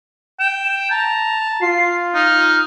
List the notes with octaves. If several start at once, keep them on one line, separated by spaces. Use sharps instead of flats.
G5 E7
A5 A#5
F4 C7
D#4 F6